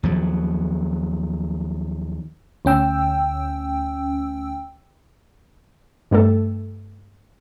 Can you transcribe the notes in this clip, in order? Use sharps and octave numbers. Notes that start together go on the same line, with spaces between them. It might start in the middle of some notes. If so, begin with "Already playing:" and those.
D#2 F3 F#3
D2 C#4 G5 E6
G2 G3 A3 A4